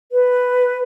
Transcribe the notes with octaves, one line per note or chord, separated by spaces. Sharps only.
B4